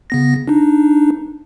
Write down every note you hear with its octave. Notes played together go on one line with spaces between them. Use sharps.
C#3 B3 A#6
D4 D#4